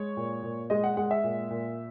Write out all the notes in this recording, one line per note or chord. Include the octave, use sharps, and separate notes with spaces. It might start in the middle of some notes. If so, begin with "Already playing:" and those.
Already playing: G#3 C#5
A#2
A#2
G#3 D#5
F#5
G#3 F#5
E5
A#2
A#2